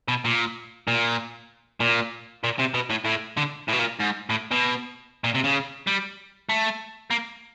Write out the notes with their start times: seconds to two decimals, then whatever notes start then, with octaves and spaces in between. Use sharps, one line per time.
0.08 B2
0.25 A#2
0.88 A#2
1.80 A#2
2.44 A#2
2.59 C3
2.74 B2
2.90 A2
3.05 A2
3.37 D3
3.68 A2
3.73 B2
3.79 A#2
3.99 G#2
4.30 A2
4.52 B2
5.24 A#2
5.35 C3
5.44 C#3
5.87 G3
6.49 A3
7.11 A#3